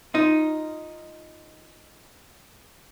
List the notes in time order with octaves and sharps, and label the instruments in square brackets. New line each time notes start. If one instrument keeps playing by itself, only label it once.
[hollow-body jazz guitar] D#4 F4